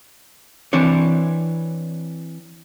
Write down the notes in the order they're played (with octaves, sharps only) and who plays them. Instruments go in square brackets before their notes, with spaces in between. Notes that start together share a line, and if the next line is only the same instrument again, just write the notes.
[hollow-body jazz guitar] E3 C4 D4 C#5